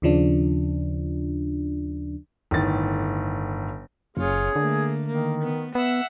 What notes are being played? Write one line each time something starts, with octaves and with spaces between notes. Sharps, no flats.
D#2 C#3 F3 D4
G1 A2 D#3 A6
F#1 C#4 F4 G#4 C#5
D3 A3 A#3
D#3 A#3
B3
B3 E5 F#5 E6